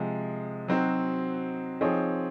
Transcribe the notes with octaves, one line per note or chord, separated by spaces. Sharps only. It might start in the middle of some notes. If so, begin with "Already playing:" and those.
Already playing: C3 F3 G#3
F#3 C4 D#4 F#4 C5
F3 C4 D#4 G#4 C#5